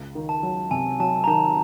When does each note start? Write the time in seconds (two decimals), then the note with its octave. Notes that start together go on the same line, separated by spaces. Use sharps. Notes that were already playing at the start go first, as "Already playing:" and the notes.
Already playing: C#2
0.15 D#3
0.29 A5
0.43 F#3
0.71 C3 G#5
1.00 F#3 A5
1.24 A#5
1.27 D#3 A5